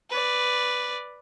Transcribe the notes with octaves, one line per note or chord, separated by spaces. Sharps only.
B4 D5